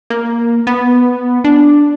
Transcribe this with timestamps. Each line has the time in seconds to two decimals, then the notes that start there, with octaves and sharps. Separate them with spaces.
0.10 A#3
0.67 B3
1.44 D4